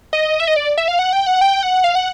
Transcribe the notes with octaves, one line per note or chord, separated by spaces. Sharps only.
D#5
E5
D#5
D5
E5
F5
F#5
G5
F#5
G5
F#5
F5
F#5